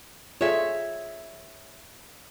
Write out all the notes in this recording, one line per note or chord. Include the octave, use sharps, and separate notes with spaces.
F4 G#4 A4 C#5 E5